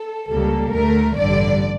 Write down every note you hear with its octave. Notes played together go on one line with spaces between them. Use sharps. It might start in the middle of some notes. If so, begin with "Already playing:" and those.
Already playing: A4
C#2 C#3 G3 A#3 A4
D2 D3 A3 A#4
A1 G2 D3 D5